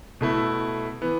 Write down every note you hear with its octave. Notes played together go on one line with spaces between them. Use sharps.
B2 A3 E4
E3 B3